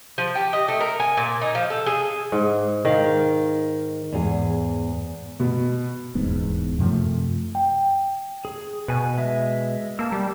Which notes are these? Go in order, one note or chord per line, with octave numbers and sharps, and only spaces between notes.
F3
G4
D#5
A3
A#4
G#5
A#2
D#4
F3
A4
G#4
G#2
D#3 F5
E2 G#2 G#4
B2
D#1 E2 G#2 B3
F#2 C3 F3 A3
G5
G#4
B2 B4 G#5
G#3 E5
A#3 A5 E6
G3